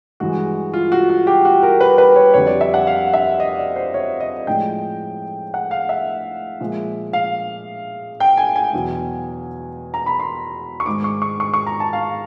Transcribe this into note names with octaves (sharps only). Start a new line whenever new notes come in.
G2 E3 G#3 F#4
F4
F#4
F#4
G4
F#4
A#4
B4
B4
C#5
F2 D3 G3 C#5
D5
E5
F#5
F5
E5
D#5
D5
C5
C#5
D#5
A2 F3 G#3 G5
F#5
F5
E5
A#2 F3 G#3
F5
G5
G#5
G#5
E2 B2 F#3
A#5
B5
C6
C#6
G#2 D#3 G#3 D6
C#6
C#6
C#6
C#6
A#5
A5
F5